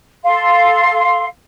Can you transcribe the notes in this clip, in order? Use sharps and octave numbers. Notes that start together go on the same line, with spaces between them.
A4 F5 C6